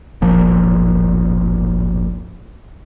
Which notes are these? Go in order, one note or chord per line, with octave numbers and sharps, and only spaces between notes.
D1 G1 A#2 F3